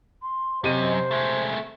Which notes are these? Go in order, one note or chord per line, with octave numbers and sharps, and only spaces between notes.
C6
F#2 C3 C5 D#5 D#7
G#3 A3 E5